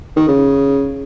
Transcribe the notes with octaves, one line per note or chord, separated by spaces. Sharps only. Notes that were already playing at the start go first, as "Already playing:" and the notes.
D#3
C#3